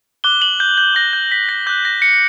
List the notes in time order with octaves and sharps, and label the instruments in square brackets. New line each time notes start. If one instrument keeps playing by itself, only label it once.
[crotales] D6 F#6 G7
F#7
G6
G6
D6 F#6 A#6
G6
B6
A#6
D6 F#6 G6
A#6
C#7